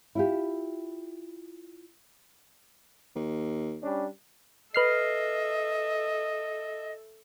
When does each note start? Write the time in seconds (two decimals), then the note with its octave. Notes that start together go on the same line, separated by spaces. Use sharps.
0.15 E4 F4 G4
3.15 D#2
3.83 G3 C#4 D4
4.74 A4 B4 D#5 E5 F6 C7